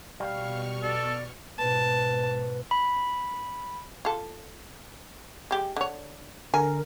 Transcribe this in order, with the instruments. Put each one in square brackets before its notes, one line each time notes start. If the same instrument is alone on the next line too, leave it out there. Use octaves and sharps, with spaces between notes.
[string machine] B2 C#6 F6 [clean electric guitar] G3 [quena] F5
[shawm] A4 [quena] D5
[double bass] G#2 B2 [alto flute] B4 [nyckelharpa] A5
[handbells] B5
[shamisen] F4 A4
G#3 G4
D3 C#5
[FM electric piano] D3 A#4 [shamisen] G#5